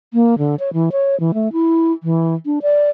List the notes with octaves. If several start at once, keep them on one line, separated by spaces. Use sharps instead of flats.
A#3
D3
C#5
E3
C#5
E3
A3
E4
E3
D4
D5